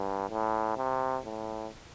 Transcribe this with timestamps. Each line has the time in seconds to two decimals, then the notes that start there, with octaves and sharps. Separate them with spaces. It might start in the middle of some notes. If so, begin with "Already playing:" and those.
Already playing: G2
0.30 A2
0.77 C3
1.25 A2